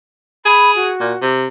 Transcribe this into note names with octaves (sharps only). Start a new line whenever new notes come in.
G#4 B5
F#4
A#2
C3